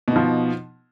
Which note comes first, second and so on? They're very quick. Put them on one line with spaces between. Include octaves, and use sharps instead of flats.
B2 D#4 F3